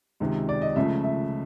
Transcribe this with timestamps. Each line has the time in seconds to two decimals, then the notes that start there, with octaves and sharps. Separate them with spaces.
0.20 C#2 C3 D#3 G#3
0.49 D5
0.62 D#5
0.76 C#2 C#3 F3 A3 E5
1.04 E5